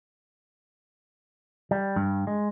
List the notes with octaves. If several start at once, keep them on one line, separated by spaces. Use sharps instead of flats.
G3
G2
G#3